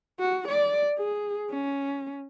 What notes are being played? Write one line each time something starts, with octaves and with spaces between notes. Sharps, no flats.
F#4
D5
G#4
C#4